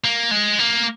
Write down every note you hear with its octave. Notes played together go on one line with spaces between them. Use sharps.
A#3
G#3
A#3